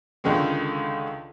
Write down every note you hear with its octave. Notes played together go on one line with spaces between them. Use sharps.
C#2 D3 D#3 G#3